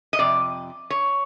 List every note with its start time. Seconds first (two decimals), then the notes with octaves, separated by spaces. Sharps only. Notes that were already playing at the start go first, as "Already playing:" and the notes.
0.13 D#5
0.19 F2 C3 D5
0.90 C#5